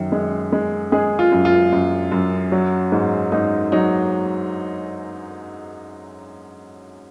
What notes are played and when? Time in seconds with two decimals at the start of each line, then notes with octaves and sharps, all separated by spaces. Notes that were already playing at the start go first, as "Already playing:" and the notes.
Already playing: F#2 D#3
0.12 G#3
0.52 G#3
0.92 G#3 G#4
1.19 F4
1.32 F#2
1.45 F4
1.72 F#2
2.12 F#2
2.52 F#3
2.92 G#2
3.32 G#2 D#4
3.72 F#3 D#4